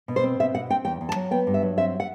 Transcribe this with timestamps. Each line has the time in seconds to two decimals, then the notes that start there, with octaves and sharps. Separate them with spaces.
0.08 B2
0.16 C5
0.24 C4
0.40 B2 E5
0.54 B2 F#5
0.70 C4 G5
0.85 E2 G5
1.01 E2
1.09 A5
1.15 F#3
1.31 B3 G5
1.47 G2
1.54 E5
1.62 F#3
1.77 C4 E5
2.00 F#5